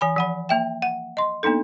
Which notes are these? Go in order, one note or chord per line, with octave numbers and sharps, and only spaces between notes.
E3 G#5 B5
F3 F#5 B5
A#3 E5 G5
F#5
D#5 C6
A#3 B3 D4 D#4 A4